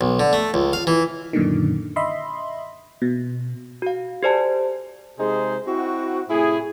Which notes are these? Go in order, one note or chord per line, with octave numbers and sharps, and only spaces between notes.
B1
D3
A3
C#2
F5
E3
F#2 A#2 D3 D#3
D#5 E5 B5 C6
B2
F#4 F5
G4 A4 C5 D5 G#5 A5
C3 G#3 D#4 G#4 C5
C4 E4 F#4
A2 C3 E4 G#4